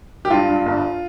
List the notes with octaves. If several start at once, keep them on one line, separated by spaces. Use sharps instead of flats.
G4
G2 F4
G2
G1